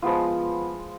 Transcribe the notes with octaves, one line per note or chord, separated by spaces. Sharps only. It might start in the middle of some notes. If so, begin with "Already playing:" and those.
F3 G#3 B3 F4